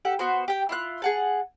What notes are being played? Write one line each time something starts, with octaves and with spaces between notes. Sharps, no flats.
G4 A4 F#5
B3 F#4 C5
G4 G5
E4 F4 F#6
G#4 F#5 A5